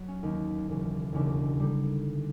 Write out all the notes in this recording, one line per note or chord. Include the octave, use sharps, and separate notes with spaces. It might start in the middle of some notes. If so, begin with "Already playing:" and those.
Already playing: F#3
C#4
D#2 D#3 F#3 D#4
E1 D#2 C#3 E3
E1 D#2 C#3 E3 D4
D3 G3 D#4